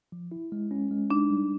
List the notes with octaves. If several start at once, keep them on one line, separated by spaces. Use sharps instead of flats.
F3
E4
G#3
C#4
G#3
D4 D#4
G3